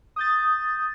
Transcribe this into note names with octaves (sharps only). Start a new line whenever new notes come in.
D#6 G6 A6